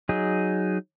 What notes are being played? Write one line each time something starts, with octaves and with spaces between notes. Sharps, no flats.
F#3 D#4 G#4